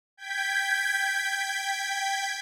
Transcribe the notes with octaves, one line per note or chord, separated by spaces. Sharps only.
G5 G6 G#6 B6